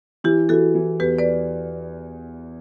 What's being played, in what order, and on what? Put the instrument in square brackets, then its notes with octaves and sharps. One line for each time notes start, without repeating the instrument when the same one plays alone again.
[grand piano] E3 [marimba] E4 G4
[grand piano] E3 [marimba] F#4 A4
[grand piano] E3
[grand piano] E2 [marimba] G4 B4
[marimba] B4 D5